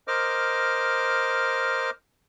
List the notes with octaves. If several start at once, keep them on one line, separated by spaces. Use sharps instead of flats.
A#4 C5 D#5 D6 F6